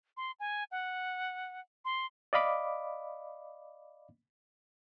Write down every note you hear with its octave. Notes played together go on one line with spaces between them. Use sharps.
C6
G#5
F#5
C6
D5 D#5 F5 B5 D6